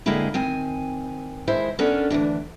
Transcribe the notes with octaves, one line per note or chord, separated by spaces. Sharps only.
D3 G#3 A#3 C4 E4 G#4
D#3 C4 G#5
D#3 G#3 E4 C5 E5
B3 C#4 D4 A4 A#4
D2 A#2 E3 D4